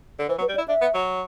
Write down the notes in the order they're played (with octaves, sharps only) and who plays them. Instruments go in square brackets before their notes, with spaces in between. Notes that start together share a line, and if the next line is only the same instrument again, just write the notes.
[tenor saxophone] D3
[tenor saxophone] E3 [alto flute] C5
[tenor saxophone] F#3
[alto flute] B4
[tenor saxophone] G3
[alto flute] D5
[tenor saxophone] E4
[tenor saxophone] D4 [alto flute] E5
[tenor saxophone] B3
F#3